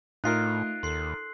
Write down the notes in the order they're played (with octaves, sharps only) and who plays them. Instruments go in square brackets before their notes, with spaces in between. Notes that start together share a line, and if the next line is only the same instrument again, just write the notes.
[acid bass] A2 [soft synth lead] A3 [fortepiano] D#4 F4 A#4 [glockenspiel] F#6 C7
[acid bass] D#2 [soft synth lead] A4 [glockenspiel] C6 C7